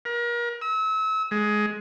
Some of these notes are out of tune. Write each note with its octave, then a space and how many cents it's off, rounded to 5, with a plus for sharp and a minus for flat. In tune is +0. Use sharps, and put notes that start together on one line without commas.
A#4 +35
E6 -35
G#3 +15